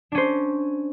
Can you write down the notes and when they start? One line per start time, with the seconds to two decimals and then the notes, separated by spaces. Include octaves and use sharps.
0.12 D4
0.15 C#4
0.18 C5